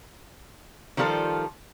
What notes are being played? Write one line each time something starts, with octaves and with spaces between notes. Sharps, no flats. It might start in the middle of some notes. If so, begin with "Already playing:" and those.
D#3 F3 G3 F4 A4